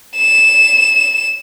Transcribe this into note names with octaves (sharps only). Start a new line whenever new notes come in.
E7